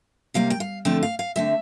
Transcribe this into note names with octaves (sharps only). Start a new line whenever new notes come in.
C3 G3 A#3 F5
G5
F5
D3 F3 A3 C4 G5
F5
F5
D3 A3 C4 E5